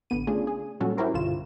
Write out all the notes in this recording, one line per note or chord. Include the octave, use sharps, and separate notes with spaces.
A1 D3 B3 D#7
C#3 A3 D4 F4 G#4
G#4
A#2 F#3 G3 C#4 F#4 A4
C#4 E4 F#4 G4 A#4 C5
B1 G2 D3 F4 E7